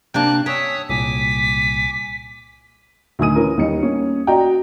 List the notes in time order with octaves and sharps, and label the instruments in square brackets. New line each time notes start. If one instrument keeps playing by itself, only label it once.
[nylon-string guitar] C3 A#3 D4 [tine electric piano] G5 [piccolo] F#6
[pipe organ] C#5 D#6 [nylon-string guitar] G5 [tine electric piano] G#5 C#6 E6 [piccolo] B6
[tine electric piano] C2 A#2 [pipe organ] G#5 D6 [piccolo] B6
[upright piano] D2 D#3 G#5 D#6 D#7
E3 C#4 A#4
D#2 G3 D#4 C#7
A#3 C#4
F#4 D5 D#5 G5 A#5